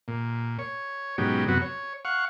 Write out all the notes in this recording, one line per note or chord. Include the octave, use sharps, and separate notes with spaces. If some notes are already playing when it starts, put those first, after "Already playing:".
A#2
C#5
G#2 B2 D#3 F#3 C#4 G4
F#2 C3 F#3 B3 F#4
C#5
F5 F#5 C#6